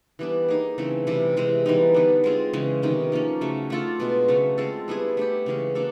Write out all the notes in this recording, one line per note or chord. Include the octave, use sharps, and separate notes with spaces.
E3 G3 B3 D4
A#3 D#4 G#4
C#3 E3 A3 C4
C3 E3 G3
C3 E3 G#3 C4
E3 G3 B3 D#4
D3 G3 B3
G#3 C4 F4 G#4
C#3 E3 G#3
C3 D#3 F#3 B3
F3 A#3 C#4
C#3 F#3 A3
A3 D4 F4 A4
B2 G#3 B3
C#3 F#3 A3
G#3 C4 F4 A4
G3 B3 E4 G#4
A3 D4 G4
C#3 E3 G#3 C#4
A#3 D4 F#4 A4